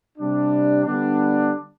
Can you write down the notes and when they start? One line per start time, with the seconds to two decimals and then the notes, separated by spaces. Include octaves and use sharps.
0.18 C3 G3 D4
0.85 D3 G3 B3 D4